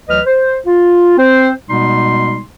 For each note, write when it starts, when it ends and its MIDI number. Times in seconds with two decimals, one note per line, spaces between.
0.09 0.20 38
0.09 0.20 52
0.09 0.20 54
0.09 0.20 71
0.09 0.20 75
0.09 0.20 89
0.26 0.57 72
0.66 1.15 65
1.18 1.51 60
1.18 1.51 72
1.69 2.41 47
1.69 2.41 55
1.69 2.41 56
1.69 2.41 59
1.69 2.41 63
1.69 2.41 84